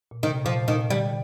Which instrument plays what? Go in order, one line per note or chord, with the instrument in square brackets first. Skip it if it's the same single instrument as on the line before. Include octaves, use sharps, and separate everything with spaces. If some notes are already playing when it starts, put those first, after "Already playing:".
[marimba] A#2
[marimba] C3 [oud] D#3
[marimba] A#2 [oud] F3
[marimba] A#2 [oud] D#3
[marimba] D3 [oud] G3